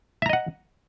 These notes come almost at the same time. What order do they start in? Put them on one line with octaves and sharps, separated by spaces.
E5 A#5 D#5 F#5